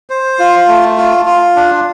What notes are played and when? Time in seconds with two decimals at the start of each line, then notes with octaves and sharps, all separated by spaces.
0.10 C5
0.39 F4
0.68 A3
0.97 F4
1.25 F4
1.56 D4